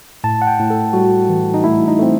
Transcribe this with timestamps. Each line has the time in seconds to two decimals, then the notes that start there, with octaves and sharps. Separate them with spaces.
0.24 A2 A5
0.42 F#5
0.47 G5
0.59 A2
0.70 A4
0.93 G3 F#4
1.29 E3
1.54 D#4
1.64 A3 E4
1.88 D#4
1.99 A3 C4